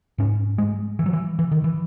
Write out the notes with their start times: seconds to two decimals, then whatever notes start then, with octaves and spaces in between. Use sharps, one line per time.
0.18 G#2 C#4
0.58 G#3
0.99 E3
1.06 F#3
1.13 E3
1.39 E3
1.52 D#3
1.64 E3